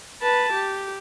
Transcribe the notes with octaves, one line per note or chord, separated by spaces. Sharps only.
B4 A5
G4